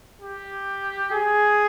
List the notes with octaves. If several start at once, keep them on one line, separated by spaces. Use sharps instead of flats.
G4
G#4